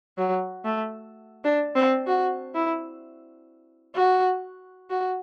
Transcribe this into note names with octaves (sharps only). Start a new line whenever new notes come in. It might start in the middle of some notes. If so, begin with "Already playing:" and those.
F#3
A3
D4
C4
F#4
E4
F#4
F#4